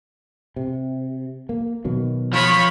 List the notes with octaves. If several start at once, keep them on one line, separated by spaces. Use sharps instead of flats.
C3
A#3
B2 D#3 F#3
F3 C#5 B5